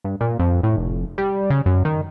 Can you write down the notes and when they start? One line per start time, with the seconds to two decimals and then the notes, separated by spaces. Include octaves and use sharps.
0.04 G2
0.21 A#2
0.39 F2
0.63 A2
0.77 F1
1.18 G3
1.50 C#3
1.66 F#2
1.85 D#3